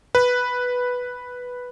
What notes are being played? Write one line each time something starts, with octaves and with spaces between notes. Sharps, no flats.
B4